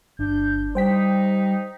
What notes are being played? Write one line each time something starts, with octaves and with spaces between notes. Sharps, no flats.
G1 D4 G6
G3 D#4 C5 G5 B6